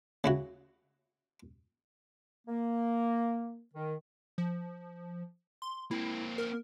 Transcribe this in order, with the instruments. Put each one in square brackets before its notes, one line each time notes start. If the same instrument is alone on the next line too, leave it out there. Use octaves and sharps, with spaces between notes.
[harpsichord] C#3 E4 F#4
[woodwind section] A#3
D#3
[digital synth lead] F3
C6
[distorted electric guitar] A#3 C4 [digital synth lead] E4
[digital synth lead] A#4